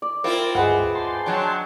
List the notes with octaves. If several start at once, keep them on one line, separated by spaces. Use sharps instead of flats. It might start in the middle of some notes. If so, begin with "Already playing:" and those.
D5
C4 E4 F4 A#4
D2 G2 G#3 B4 F#5
G5 A5 C6
F#3 D4